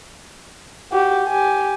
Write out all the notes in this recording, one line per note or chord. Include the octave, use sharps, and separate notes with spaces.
F#4 G4
G4 G#5